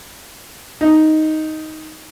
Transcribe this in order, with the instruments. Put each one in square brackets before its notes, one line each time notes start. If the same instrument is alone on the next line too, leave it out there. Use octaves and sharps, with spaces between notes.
[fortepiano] D#4